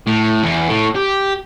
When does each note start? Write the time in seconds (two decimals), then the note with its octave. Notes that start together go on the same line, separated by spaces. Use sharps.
0.07 A2
0.43 E2
0.69 A2
0.95 G4